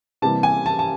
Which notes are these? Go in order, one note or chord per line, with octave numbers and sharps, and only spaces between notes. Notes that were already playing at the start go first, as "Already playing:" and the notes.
C3 E3 G3 A#3 A5
G#5
A5
A5